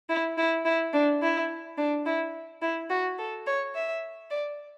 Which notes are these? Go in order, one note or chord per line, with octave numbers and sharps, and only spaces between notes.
E4
E4
E4
D4
E4
D4
E4
E4
F#4
A4
C#5
E5
D5